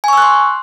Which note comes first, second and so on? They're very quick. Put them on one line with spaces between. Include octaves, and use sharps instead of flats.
G#5 C#6 E6 F#6 C6